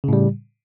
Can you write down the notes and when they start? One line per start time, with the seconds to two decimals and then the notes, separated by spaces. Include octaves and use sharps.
0.04 C#3
0.08 A2
0.13 G3